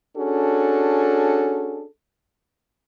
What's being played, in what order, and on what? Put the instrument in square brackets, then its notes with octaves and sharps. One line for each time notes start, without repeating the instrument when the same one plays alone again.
[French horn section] C#4 D4 F#4 G#4 A4